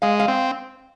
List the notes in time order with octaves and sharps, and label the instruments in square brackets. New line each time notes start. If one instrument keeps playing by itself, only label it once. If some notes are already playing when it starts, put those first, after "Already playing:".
[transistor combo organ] G#3 [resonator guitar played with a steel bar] F5
[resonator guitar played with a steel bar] F5
[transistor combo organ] C4